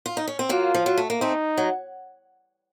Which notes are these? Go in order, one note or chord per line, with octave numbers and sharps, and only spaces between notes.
F4
D#4
C#4
C4
F#3 A#3 F4
F3
F#3
A3
A#3
A3 C4 D#4
F#3